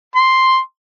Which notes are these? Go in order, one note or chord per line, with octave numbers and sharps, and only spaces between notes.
C6